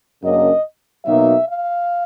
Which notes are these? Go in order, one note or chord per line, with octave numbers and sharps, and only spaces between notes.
F#2 C#3 F#3 A#3 D4 D#5
B2 F#3 A#3 D#4 E5
F5